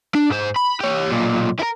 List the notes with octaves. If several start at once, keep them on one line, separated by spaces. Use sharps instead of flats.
D4
G#2 C5
B5
G4 C#5
B1 A#2
E4 A#4